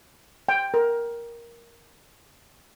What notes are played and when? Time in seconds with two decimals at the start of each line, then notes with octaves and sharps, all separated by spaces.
0.49 G5
0.74 A#4